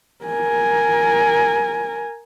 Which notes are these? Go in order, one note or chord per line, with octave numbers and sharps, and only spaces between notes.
A#4 G#5